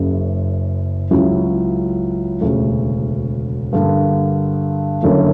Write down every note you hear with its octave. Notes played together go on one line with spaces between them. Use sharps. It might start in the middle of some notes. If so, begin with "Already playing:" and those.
Already playing: F#1 F#2 C#3
C#2 C#3 F#3 C#4 E4
E1 D2 C#3
G2 D3 A#3
F#1 F#2 D3 A#3 C#4